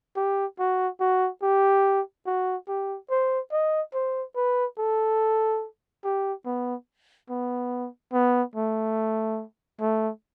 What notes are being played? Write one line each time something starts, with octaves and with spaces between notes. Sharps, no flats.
G4
F#4
F#4
G4
F#4
G4
C5
D#5
C5
B4
A4
G4
B3
B3
B3
A3
A3